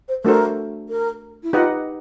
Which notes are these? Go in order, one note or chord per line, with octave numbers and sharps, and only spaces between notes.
C5
A3 D4 F#4 A4 A#4 C5
A#4
E4
D#4 F4 G4 B4 D#5 F#5